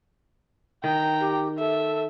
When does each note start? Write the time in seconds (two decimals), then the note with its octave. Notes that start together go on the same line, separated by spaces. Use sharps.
0.84 D#3 G5 A#5
1.20 G4
1.59 A4 E5